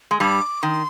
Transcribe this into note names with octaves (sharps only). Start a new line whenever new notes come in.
G#3
G2 G3 D6
D#3 C6